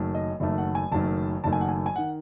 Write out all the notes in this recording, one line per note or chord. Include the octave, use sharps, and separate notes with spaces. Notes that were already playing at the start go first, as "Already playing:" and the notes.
Already playing: F#1 F#2 D#3 A3
D#5
F#1 F#2 D#3 A3 E5
F#5
G#5
F#1 F#2 D#3 A3 A5
F#1 F#2 D#3 A3 A5
G#5
F#5
G#5
G#5
D#3 F#5